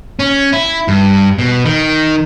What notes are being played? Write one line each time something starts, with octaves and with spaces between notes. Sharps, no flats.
C#4
E4
G2
B2
D#3